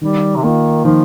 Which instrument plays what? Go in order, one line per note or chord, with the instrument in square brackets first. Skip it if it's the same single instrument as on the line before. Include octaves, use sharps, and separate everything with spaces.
[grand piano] D#3 [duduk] G3
[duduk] C3
[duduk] D#3 [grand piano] A#3 F4
[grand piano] D#3 [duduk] F3